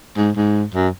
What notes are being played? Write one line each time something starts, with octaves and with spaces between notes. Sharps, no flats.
G#2
G#2
F#2